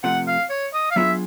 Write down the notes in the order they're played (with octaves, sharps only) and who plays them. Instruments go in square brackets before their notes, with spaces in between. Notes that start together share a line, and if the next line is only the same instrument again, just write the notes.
[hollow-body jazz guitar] C3 F3 A3 [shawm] F#5
[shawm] F5
C#5
D#5
F5
[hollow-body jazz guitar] F#3 B3 D4 F4 G#4 [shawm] E5